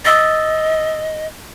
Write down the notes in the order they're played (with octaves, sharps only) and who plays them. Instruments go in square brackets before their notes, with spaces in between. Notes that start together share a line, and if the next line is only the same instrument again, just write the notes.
[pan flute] D#5 [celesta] D#6 E6 A6